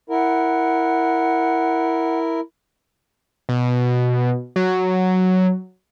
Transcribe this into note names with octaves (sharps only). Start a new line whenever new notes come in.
E4 A#4 F#5
B2
F#3